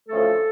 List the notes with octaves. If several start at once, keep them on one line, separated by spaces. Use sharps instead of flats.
D2 C#3 F3 A3 A4